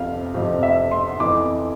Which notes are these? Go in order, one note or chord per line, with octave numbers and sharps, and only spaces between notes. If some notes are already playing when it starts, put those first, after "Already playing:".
Already playing: F2 C3 F3 F5
F2 C3 F3
E5
C6
F2 E3 D6